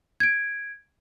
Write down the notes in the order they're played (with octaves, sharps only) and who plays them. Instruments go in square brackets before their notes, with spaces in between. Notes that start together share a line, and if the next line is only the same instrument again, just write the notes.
[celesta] G#6 D7